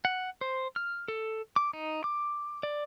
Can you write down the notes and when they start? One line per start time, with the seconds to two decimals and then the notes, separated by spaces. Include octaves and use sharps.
0.05 F#5
0.41 C5
0.76 F6
1.08 A4
1.56 D6
1.73 D#4
2.04 D6
2.63 D5